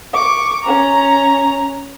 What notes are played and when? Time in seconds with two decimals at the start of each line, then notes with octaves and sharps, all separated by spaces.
0.13 C#6 D6
0.64 C#4 A#5